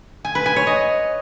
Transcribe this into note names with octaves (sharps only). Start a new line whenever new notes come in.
G#5
B4
G#5
C#5
D#5